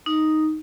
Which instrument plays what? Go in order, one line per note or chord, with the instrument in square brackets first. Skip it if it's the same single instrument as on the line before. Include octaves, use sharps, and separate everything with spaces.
[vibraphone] D#4